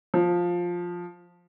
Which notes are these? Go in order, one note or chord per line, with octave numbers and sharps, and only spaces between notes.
F3